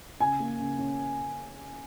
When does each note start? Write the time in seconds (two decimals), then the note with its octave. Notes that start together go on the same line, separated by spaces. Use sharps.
0.20 C#3 G#5
0.40 A#3
0.59 C#3
0.79 C#4